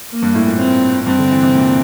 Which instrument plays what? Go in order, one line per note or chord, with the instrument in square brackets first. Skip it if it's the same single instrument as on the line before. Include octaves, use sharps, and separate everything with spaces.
[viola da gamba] A#3
[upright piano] G2
A2
A#2
[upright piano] A2 [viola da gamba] C4
[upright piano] G2 [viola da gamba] C4
[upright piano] D3
E3
C3
A#2